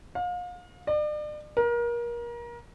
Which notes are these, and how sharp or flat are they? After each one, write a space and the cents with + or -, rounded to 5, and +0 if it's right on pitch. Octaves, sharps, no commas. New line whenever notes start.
F5 +35
D5 +40
A#4 +30